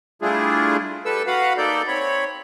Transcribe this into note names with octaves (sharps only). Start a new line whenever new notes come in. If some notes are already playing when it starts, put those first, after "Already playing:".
G3 A3 D4 E4 F4 G#4
G3 A4 B4 E6
F#4 B4 F5 F#5 B5
A#3 D#4 A4 D5 G6
C4 C#5 B5